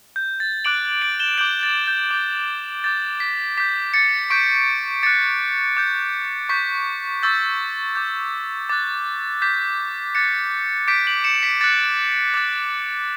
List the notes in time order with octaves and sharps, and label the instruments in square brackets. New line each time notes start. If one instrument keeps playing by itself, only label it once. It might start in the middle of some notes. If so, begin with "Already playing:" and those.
[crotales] G6
A6
D6 F#6 D7 F#7
D7 F#7
E7 G7
G6 D7 F#7
D6
A6
G6
D6 G6
D6 G6 A6
B6
D6 G6 B6
A6 C#7
C#6 G6 B6 D7
D6 F#6 A6 C#7
D6 G6
C#6 G6 B6
C#6 E6 G6 A6
D6 G6
D6 F#6 A6
D6 G6 B6
D6 F#6 A6 C#7
D6 G6 B6 D7
D7 F#7
C#7 E7
B6 D7
D6 F#6 A6 C#7
D6 F#6 A6